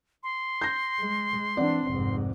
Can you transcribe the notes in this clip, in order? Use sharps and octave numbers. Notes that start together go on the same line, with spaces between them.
C6
G6 A#6
G#3
E3 C4 D4 D5 F#5
F1 G#2